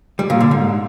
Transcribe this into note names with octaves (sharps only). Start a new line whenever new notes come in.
G3
A#2
D3
G#2